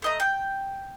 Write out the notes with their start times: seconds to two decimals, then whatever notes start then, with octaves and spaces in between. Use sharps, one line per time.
0.02 A3 D#5 A#5
0.20 G5